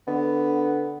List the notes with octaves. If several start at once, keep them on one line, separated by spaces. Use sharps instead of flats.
D3 B3